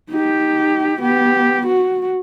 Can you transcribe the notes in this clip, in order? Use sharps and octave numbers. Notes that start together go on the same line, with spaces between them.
D#4 G4
B3 G4
F#4